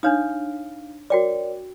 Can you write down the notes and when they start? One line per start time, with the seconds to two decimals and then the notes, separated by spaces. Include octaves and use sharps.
0.03 D4 D#4 C#5 F5 D#6 F6
1.10 F#4 A#4 C#5 D5 G5 D6